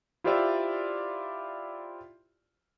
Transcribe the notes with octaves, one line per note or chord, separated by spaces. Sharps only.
E4 F4 G4 C5 D5 E5